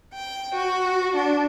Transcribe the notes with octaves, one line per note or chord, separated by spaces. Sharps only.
G5
F#4
D4